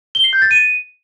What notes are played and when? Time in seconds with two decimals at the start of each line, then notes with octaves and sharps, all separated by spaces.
0.15 G7
0.24 C7
0.33 G6
0.42 A6
0.51 D#7